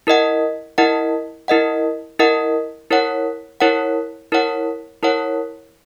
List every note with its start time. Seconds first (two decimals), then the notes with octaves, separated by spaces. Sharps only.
0.07 E4 A#4 D#5 F#5
0.78 E4 A#4 D#5 F#5
1.48 E4 A#4 D#5 F#5
2.19 E4 A#4 D#5 F#5
2.91 E4 A#4 C#5 F#5
3.60 E4 A#4 C#5 F#5
4.32 E4 A#4 C#5 F#5
5.03 E4 A#4 C#5 F#5